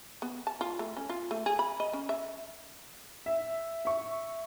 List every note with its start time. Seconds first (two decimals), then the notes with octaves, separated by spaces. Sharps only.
0.22 B3
0.47 A5
0.61 F4
0.79 A3
0.97 C#4
1.10 F4
1.31 A3
1.46 G#4
1.59 B5
1.80 D#5
1.93 C#4
2.09 E5
3.26 E5
3.85 E5 C#6